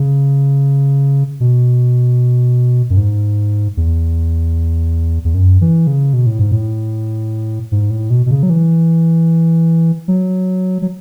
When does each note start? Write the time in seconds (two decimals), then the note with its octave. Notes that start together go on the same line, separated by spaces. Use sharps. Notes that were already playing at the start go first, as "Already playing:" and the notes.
Already playing: C#3
1.40 B2
2.90 F#2
2.97 G#2
3.77 E2
5.25 E2
5.34 F#2
5.61 E3
5.87 C#3
6.13 B2
6.26 A2
6.39 G#2
6.52 A2
7.72 G#2
7.90 A2
8.10 B2
8.26 B2
8.31 C#3
8.43 F#3
8.50 E3
10.08 F#3
10.82 F#3